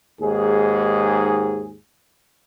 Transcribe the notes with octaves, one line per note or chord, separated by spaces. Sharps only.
D#2 G#2 G#4